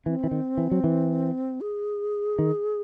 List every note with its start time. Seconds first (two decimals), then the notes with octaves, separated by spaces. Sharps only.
0.05 E3 C4
0.24 E3
0.31 D#3
0.57 E3
0.71 F#3
0.84 E3
1.61 G#4
2.39 D#3